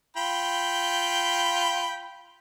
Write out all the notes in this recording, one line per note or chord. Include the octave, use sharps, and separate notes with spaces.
F4 G5 B5